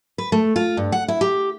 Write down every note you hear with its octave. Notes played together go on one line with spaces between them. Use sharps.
B4
A3
F4
G2
F#5
E4
G4